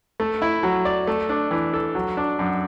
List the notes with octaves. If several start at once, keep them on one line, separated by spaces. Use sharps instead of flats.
A3
E4
F#3
D5
A3
D4
E3
A4
F#3
D4
F#2